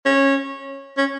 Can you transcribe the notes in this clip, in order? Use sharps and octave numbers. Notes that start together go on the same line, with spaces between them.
C#4
C#4